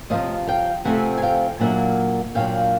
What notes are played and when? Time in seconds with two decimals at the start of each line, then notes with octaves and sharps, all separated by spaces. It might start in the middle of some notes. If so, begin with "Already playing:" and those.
0.10 C3 F3 A3 C4 D#5 F5
0.47 F5 G5
0.85 C3 F3 A3 C4 F#5 G#5
1.17 G#5
1.22 F5 G5
1.60 A#2 F#3 A#3 D4 E5 F#5
2.35 A#2 F#3 A#3 D4 F5 G5